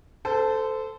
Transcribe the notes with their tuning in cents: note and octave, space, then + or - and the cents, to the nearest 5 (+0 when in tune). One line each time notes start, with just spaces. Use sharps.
A4 +0 C5 -25